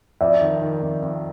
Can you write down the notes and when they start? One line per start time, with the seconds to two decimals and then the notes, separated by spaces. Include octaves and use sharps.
0.21 F2 D5 E5
0.41 D#3
0.62 D#3
0.82 F2
1.02 F2